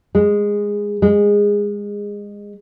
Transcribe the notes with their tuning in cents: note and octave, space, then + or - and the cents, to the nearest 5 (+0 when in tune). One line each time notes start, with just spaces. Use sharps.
G#3 -15
G#3 -20